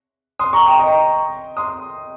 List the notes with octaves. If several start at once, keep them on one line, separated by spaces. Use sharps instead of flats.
C6 D#6
A#5 C#6
G5 A#5
D#5 G5
C6 D#6